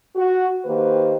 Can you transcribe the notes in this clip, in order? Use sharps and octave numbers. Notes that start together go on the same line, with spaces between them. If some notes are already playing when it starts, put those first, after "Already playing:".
F#4
D#3 A#3 G4 B4 C5